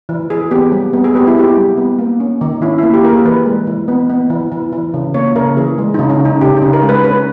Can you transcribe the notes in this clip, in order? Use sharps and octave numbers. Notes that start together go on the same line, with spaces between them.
E3
E3 G#4
B3 G4
G3
B3
G#4
B3 G4
E4
B3 G4
G3
B3
A#3
C#4
D#3
C#4 E4
A#3 E4
G4
A#3 A#4
G#4
E3 B4
G#3
E3
B3
B3
E3
E3
E3
C#3
A#3 C#5
C#3 A#4
E3 G#4
G#3
C#3 D#4
C#4
C#3
D#4
C#3 G4
D#4
C#3
A#4
G#3
B4
C#4 B4